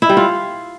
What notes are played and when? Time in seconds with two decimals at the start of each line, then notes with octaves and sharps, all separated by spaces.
0.02 E4
0.09 G3
0.17 F4